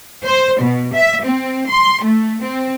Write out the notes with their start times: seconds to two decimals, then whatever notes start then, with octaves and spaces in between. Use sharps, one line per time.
0.24 C5
0.62 B2
0.95 E5
1.25 C4
1.70 C6
2.04 A3
2.42 C4